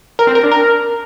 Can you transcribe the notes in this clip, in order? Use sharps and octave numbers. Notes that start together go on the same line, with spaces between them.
A#4
C4
A#4
D4
A#4